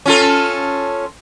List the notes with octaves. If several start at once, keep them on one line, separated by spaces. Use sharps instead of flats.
C#4 F4 A4